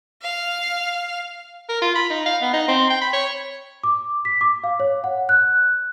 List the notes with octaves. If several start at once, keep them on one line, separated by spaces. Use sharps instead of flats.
F5
A#4
F4
B5
D#4
F5
B3
D#4
C4
G5
B5
C#5
D6
B6
D6
F5
C#5
F#5
F#6